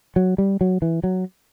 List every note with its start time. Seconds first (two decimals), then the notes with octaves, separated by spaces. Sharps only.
0.16 F#3
0.38 G3
0.61 F#3
0.82 E3
1.04 F#3